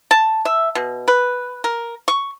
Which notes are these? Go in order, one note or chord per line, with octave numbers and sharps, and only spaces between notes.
A5
E5
B2
B4
A#4
C#6